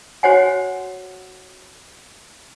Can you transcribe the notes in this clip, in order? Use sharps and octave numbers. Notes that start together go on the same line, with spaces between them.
F#4 C5 C#5 F#5 G#5